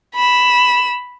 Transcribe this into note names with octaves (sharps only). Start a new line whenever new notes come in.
B5 E7